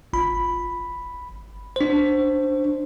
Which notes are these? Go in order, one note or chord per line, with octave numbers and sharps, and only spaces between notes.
G1 B5
D4 C5